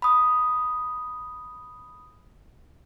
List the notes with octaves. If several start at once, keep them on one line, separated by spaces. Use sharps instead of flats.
B5 D#6